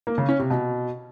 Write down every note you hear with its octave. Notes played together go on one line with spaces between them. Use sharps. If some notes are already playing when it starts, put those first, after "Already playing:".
A#3
C#3
C#4
C3
B2